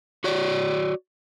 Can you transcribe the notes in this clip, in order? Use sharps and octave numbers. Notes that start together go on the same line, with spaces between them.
F#4 C#5 D5